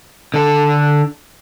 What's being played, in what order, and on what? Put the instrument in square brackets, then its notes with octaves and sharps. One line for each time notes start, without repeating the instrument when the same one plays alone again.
[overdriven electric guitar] D3 A4